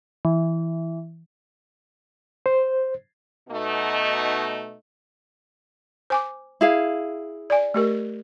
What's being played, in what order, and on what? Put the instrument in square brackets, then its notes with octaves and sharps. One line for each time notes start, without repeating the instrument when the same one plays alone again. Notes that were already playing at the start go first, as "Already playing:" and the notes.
[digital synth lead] E3
[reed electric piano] C5
[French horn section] B2 A3 D#4
[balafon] C5 G#5 D6
[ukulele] E4 G#4 F5
[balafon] D5 G#5
A3 G4 A#4